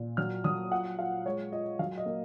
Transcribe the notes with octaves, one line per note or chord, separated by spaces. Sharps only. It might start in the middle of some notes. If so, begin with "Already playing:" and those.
Already playing: A#2
F#3 F6
F#3 D#6
F4 F#5
F4 F5
G#3 C#5
F4 D#5
F#3 F5
D#5
A#3